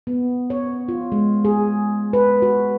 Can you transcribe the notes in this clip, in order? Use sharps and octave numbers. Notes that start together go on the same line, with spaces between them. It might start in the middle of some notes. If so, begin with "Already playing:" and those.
B3
C#5
F4
G#3
G#4
B4
F#4